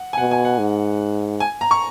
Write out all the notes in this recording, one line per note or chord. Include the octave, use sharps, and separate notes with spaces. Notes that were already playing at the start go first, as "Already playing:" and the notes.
Already playing: F#5
G#5
B2 F#5
G#5
F#5
G#2
G#5
A#5
C#6